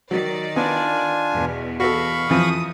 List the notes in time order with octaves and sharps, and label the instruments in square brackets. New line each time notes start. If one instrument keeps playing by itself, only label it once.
[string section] D#3 D5 [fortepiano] F#3
[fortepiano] B3 [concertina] D4 F4 G#5
[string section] E2 B2
[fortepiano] F#4 A4 [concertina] F5 B5 C#6
[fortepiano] F2 E3 F3 [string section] D#6